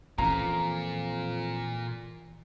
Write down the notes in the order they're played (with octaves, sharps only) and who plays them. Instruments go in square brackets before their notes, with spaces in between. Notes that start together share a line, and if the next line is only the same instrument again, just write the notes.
[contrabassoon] F2 [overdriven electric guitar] A#2 [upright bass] E3 [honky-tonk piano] A#5